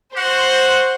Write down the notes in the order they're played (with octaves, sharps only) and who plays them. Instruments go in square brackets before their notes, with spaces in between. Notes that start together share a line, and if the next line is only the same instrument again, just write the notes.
[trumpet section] F#4 F#5 [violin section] C5 C6